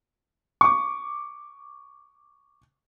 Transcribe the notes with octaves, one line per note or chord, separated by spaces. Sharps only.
C#6 D6